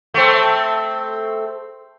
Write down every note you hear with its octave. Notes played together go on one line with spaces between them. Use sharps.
A3 C4